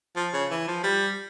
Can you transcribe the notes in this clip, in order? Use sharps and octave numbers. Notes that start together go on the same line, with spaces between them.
F3
C#3
E3
F3
G3